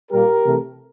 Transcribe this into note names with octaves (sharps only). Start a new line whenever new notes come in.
A#2 G3 A#3 G4 A#4
C3 E3 A3